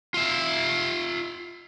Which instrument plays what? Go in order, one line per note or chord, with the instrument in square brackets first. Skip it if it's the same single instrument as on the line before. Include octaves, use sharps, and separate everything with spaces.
[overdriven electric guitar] F4 E5